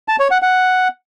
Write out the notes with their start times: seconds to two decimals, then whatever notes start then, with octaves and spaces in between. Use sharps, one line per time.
0.08 A5
0.20 C#5
0.31 F#5
0.42 F#5